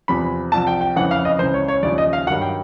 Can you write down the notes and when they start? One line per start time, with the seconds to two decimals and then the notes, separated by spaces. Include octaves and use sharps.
0.08 E2 C3 F3 B5
0.52 C2 C3 F3 A5
0.67 G5
0.81 G5
0.96 F2 C#3 E3 F#5
1.11 F5
1.25 D#5
1.39 E3 C5
1.42 C#2 C#3
1.54 C#5
1.68 C#5
1.83 D#2 C#3 F3 D5
1.98 D#5
2.13 F5
2.27 F#3 F#5
2.30 G2 D#3
2.42 G5